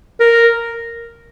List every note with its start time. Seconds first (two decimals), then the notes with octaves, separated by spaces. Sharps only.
0.20 A#4